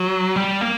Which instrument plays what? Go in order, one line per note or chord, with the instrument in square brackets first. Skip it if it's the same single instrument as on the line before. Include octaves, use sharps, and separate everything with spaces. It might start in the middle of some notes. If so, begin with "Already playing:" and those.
Already playing: [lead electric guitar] F#3
G3
A#3